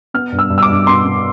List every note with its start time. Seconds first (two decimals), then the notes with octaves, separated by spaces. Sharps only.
0.14 B3 F6
0.32 G2
0.39 E6
0.50 G2
0.58 E6
0.63 D6
0.68 G2
0.87 B3 C6
1.05 B3